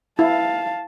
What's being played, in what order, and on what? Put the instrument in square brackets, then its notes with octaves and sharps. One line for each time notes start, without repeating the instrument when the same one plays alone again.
[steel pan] E4 [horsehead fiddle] F5 A5